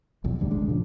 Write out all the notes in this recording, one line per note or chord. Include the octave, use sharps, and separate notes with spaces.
F1 B1 E2
D#1 D2 G2 G3
G#1 G#2 G#3 D4
A#2 C#3 F3